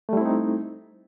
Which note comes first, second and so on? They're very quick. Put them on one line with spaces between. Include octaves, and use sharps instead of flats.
A3 G3 E4 C4 D#4